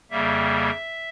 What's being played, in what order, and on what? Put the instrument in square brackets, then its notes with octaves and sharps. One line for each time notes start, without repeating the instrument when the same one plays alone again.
[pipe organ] F2 C#3 G3 A#3 E5